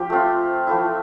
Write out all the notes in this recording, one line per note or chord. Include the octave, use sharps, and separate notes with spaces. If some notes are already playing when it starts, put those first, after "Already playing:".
Already playing: F3 G4
A3 C4 F4
F3 A3 E4